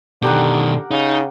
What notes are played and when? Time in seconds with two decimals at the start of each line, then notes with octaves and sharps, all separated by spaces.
0.22 B2 D3 D#3 G4 A#4 F#5
0.91 C#3 D#4